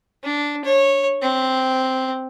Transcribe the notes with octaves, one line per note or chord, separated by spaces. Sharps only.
D4
C#5
C4